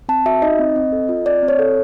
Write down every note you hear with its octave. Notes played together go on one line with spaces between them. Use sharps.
C4 A5
F#4 E5
D#4 D#5
C4
C4
A4
F4
C4 D5
C4
C#5
A4